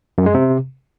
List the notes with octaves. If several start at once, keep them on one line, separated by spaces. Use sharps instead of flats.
F#2
G#3
C3